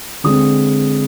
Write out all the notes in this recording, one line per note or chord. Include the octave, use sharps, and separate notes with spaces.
D3 G#3 C4 D#6